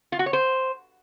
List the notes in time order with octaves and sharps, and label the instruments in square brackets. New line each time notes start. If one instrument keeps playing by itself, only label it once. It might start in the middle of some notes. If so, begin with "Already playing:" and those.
[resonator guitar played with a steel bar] F4
F#4
C#5
C5